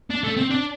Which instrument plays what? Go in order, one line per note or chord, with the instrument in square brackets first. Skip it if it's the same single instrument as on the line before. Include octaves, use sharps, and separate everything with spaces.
[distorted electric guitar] D4
A3
C4
D4